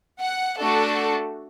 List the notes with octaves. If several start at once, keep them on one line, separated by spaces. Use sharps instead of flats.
F#5
A3 D4 F#4 A4